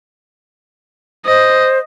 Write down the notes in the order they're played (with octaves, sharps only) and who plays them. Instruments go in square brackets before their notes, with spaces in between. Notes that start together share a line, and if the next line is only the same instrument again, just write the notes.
[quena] C5 [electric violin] D#5